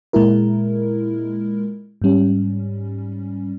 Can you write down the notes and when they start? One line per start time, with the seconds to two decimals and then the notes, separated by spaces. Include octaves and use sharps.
0.13 A#2 G#3 E4 A#4
2.02 G#2 G3 C#4